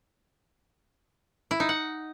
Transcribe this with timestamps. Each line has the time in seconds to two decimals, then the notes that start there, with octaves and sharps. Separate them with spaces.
1.51 E4
1.60 D#4
1.69 F#5